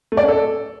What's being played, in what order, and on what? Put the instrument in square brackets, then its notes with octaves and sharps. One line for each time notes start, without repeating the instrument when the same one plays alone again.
[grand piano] A3
D5
C#4
A4